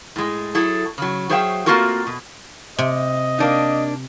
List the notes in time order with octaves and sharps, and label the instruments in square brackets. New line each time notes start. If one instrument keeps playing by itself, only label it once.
[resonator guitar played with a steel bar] A2 G#3
F#3 E4 G#4 A4
C#3 F#3
F#3 G#4 C5 E5 F5 G5
A3 A#3 C4 F4 F#4 A#4
B2
[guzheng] C3 [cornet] D#5
[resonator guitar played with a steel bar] A#3 D4 D#4